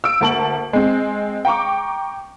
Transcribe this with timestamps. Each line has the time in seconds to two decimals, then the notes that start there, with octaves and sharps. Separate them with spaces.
0.04 E6 D7
0.21 D2 A#3 A5 C#6 F#7
0.73 G#3 C4
1.45 G5 A#5 C#6 D6